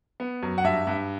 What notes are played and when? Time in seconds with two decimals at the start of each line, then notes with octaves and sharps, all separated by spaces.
0.20 B3
0.43 F#2
0.58 F#5
0.64 G2 E5
0.87 G2